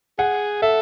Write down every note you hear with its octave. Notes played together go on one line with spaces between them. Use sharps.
G#4 F#5
A4 E5